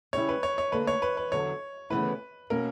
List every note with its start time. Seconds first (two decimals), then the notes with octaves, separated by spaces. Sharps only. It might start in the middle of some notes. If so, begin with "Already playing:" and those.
0.13 C#3 G3 C#4 E4 C#5
0.29 B4
0.43 C#5
0.58 C#5
0.72 D3 A#3 D4 B4
0.87 C#5
1.02 B4
1.17 B4
1.32 E2 D3 F#3 C#5
1.90 D2 C#3 E3 B3 E4 B4
2.50 B2 A#3 C#4 A#4